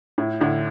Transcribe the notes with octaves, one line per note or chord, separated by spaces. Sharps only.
A2
A2 D3